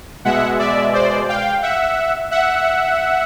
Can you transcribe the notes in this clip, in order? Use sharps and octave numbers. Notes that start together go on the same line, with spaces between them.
B2 G#3 E5 F#5
D5 E5
C5 D5
F5 G5
E5 F#5
E5 F#5